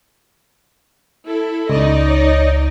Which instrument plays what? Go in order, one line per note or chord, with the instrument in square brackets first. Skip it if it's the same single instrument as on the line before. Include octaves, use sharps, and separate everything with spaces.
[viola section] E4 A4
[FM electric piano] C#2 [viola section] D#4 D5 D#5
[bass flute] C#5